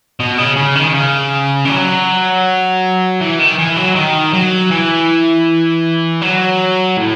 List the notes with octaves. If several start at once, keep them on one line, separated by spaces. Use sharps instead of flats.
B2
C#3
C#3
D#3
C#3
E3
F#3
E3
D#3
E3
F#3
D#3
F#3
E3
F#3
A2